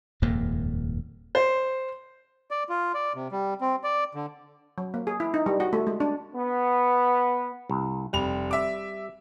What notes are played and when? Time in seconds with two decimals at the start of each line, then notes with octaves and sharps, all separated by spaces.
0.22 D#1 F2 G#2 A#3
1.35 C5
2.51 D5
2.69 F4
2.94 D5
3.15 C3
3.32 G3
3.61 C4
3.84 D5
4.15 D3
4.78 F#3
4.94 A#3
5.07 G#4
5.20 E4
5.34 D#4
5.46 G3
5.60 F#4
5.73 A3
5.87 G#3
6.00 D4
6.35 B3
7.70 C2
8.13 F1 G3 F7
8.51 E5 D6